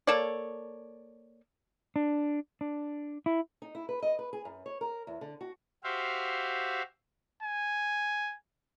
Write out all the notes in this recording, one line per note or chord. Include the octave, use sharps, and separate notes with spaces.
A#3 A4 C#5 D5
D4
D4
E4
D#4
E4
B4
D#5
B4
G#4
F#2
C#5
A#4
E2
D3
F#4
F#4 G4 C5 E5 F5
G#5